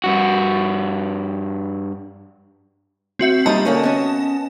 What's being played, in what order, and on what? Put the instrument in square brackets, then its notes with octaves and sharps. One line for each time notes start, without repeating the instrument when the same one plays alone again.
[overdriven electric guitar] G2 F#4
[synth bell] C4 F#4 E5
[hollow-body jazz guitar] A#2 G3 D#4 [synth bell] D#5 A5
[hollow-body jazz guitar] D3 A#3 C#4
B3 C#4